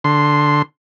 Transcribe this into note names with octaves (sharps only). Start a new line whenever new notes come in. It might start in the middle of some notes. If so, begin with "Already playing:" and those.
D3 C6